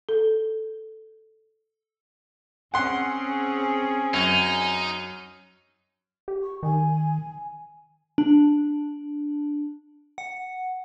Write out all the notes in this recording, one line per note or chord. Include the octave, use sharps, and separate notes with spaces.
A4
C4 C#4 G#4 F#5 G#5 C6
F#2 D#4
G4
C#6
D#3 G#5
D4
F#5